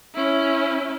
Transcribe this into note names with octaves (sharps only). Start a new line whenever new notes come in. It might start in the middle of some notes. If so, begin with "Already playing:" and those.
C#4 E4